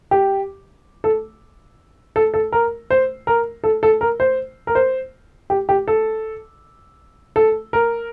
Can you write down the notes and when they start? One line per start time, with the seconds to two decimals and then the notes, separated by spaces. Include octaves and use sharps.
0.11 G4
1.04 A4
2.16 A4
2.34 A4
2.52 A#4
2.90 C5
3.27 A#4
3.64 A4
3.83 A4
4.01 A#4
4.20 C5
4.67 A#4
4.75 C5
5.50 G4
5.69 G4
5.88 A4
7.36 A4
7.73 A#4